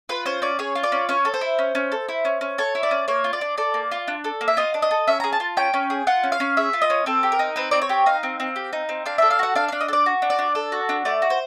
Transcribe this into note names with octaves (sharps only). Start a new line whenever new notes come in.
F4 B4
C#4 C5
C#4 D5
G#4 C#5
F4
D5
C#4
C#4 C#5
A4
C5
E4
C#4
C#4
A4
E4
C#4
C#4
A4 C#5
E4
D5
C#4
A#3 C#5
F4
D5
D4
A4 D5
A#3
F4
D4
A4
A#3
E5
F4 D#5
D4
D#5
A4
C#4 E5
G#4 A#5
A5
F4
C#4 G5
C#4
G#4
F4 F#5
C#4
F5
C#4
G#4 E5
F4
D#5
C#4
C4 A4
G4
A#4
D#4
C4 B4
C4 D5
C#5
G4
D#4 F5
C4
C4
G4
D#4
C4
D4 F5
A4 E5
F5
F#4 F#5
D4 F5
D4 F5
D#5
A4
D5
F#4
D4
D5
D4
A4
F#4
D4
A3 D5
F#4
C5